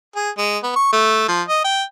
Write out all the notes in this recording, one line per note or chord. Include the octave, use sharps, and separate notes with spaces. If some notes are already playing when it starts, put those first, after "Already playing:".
G#4
G#3
B3
C#6
A3
F3
D#5
G5